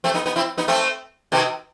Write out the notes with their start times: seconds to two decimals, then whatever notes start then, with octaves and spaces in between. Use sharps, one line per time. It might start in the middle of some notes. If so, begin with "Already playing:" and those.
0.04 A3 C4
0.14 B3 D#4
0.26 B3 D#4
0.36 C4 E4
0.58 B3 D#4
0.68 A3 C4
1.32 B2 D#3